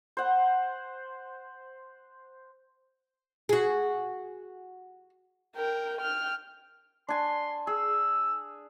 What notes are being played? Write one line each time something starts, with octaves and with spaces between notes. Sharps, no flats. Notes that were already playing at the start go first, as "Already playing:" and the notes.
C5 F#5
F#4 G#4
A#4 G5
G5 F6
D4 G#5 C6
G#4 E6